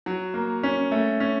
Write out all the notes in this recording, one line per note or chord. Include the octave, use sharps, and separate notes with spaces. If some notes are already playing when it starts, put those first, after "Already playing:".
F#3
A#3
C#4
A3
C#4